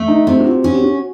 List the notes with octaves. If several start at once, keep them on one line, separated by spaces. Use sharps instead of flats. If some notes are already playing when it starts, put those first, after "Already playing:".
Already playing: A3
D#4
C3 D#4
F#4
F4
C#4 F#4
G4
F#4